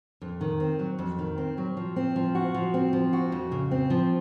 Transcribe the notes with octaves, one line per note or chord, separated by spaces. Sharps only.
F2
D#3
C4
F#3
F2
D#3
C4
F#3
F3
C4
F3
F#4
F3
C4
F3
F#4
F2
C#3
C4
F3